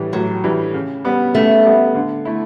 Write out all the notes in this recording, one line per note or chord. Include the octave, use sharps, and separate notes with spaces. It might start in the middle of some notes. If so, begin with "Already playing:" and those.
Already playing: A2 E3 G3
A2 F#3
E3 G3
C#3
G3 B3
C#3 A3
G3 B3
D3
A3 E4